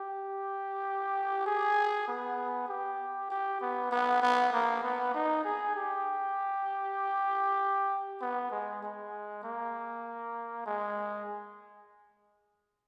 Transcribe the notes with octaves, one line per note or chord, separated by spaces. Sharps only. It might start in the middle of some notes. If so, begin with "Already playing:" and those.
Already playing: G4
G#4
B3
G4
G4
B3
B3
B3
A#3
B3
D#4
G#4
G4
B3
G#3
G#3
A#3
G#3